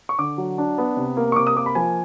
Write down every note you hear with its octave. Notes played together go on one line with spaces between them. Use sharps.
C#6
D3 D6
F#3
D4
B3
C3
A#3
C#6
C3 D6
D#6
A#3 D6
B5
F3 G#5